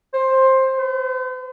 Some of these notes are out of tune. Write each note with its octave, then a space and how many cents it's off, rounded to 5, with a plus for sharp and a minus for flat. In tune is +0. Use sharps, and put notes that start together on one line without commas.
C5 +15
C5 -45